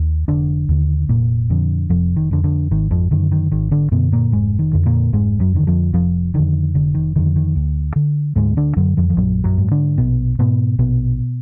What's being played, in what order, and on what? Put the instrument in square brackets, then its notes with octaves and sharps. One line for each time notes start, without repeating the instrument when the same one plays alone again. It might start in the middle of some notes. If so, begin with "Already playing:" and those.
Already playing: [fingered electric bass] D#2
F1 D3 D4
D#2 D3
F1 A#2 A#3
F2 D3
F1 F2 F3
D#3
F2 D3
D3
G#1 D#3
F2 F3
F#2 D3 D#3
D#3
G#1 D#3
D3 D4
F#2 B2 D3 B3
A#2 A#3
F1 G#2 G#3
D#3
F2 D3
A#2 A#3
F1 G#2 G#3
F#2 F#3
F2 D3 D#3
F2 F3
F1 F2 F3
F2 D3 D#3
F1 D3
D#3
F2 D3 D#3
D#3
D2
D3
D2 G#2 G#3
D3 D4
F#2 D3 F#3
F2 F3
F3
A#1 F#2 F#3
F#2 F#3
G#2
D3 D4
A#1 B2 B3
G#2 B2 B3
A#1 B2 B3